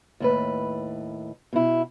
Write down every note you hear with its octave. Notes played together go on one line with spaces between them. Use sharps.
D#2 A2 B4
B2 E4